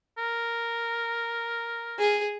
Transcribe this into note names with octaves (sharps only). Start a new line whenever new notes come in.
A#4
G#4